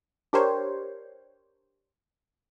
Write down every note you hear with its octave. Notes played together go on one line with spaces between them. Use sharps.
D4 G4 A#4 C5 C#5